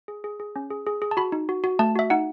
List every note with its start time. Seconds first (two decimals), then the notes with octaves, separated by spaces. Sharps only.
0.08 G#4
0.24 G#4
0.40 G#4
0.56 C#4
0.70 G#4
0.87 G#4
1.02 G#4
1.11 A5
1.17 F#4 B5
1.32 D#4
1.49 F#4
1.64 F#4
1.79 A3 A5
1.95 F#4 E5
2.10 D#4 F#5